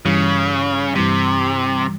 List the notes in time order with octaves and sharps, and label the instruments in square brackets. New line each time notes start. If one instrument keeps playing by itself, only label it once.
[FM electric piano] G2 E3 G3 [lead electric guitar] C#3
[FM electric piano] G2 E3 G3 [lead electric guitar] C3